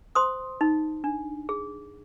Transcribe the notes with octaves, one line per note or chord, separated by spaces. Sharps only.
C5 C6 D#6
D#4
D4
G#4